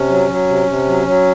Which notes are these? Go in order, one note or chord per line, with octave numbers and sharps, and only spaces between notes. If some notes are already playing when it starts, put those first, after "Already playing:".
Already playing: C3 C#4
F#3
F#3
C3
C3
F#3
F#3